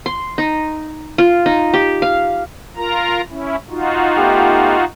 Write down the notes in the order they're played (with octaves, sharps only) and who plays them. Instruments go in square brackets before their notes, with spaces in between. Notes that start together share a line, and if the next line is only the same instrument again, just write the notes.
[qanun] C6
D#4
F4
D#4
G4
F5
[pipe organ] F4 A#4 A#5
C#4 E4
D#4 F4 F#4
[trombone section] A3 B3 G4